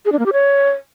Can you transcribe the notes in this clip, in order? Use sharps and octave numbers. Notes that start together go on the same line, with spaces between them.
G#4
D4
A#3
G4
C#5